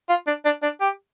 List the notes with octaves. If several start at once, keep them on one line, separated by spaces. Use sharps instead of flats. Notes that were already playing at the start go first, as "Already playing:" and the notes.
F4
D4
D4
D4
G4